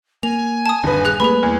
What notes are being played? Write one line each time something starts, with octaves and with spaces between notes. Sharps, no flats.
A#3 G#5 F7
A5 D#6
D#1 G2 D3 B4
G#4 F#6 F7
G3 A3 A#3 G#4 B4 B5
E2